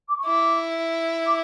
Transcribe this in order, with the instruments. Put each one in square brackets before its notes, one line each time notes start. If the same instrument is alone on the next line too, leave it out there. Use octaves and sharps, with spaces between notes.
[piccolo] D6
C#6
[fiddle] E4 [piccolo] D6
[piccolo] D6